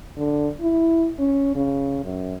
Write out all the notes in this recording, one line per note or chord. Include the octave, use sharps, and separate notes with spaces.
D3
E4
C#4
C#3
F#2